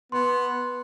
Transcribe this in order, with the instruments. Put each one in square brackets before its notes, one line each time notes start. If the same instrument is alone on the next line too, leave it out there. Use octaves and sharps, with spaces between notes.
[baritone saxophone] B3 [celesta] C6